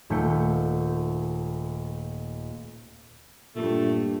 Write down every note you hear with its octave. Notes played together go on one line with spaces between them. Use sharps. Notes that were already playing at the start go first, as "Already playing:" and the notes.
D#1 A3 G6 C#7
G2 A#2 A3